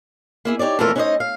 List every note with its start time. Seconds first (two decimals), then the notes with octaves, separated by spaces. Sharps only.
0.45 A#3 E4 G#4
0.59 D#4 G4 C#5 D5
0.79 F2 A#2 E3 A3 F4 A#4
0.96 C#4 D#4 F#4 B4 C5 D#5
1.20 F5